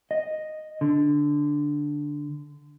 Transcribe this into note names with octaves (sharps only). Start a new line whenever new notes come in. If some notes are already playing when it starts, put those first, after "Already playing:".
D#5
D3